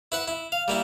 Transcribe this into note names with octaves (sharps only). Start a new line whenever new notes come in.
E4 B4 F#5
E4
F5
G3 A#3 E4